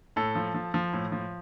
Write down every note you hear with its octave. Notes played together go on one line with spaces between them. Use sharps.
A2 A4
F3
F3
F3
A2
F3